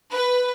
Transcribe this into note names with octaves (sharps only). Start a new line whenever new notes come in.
B4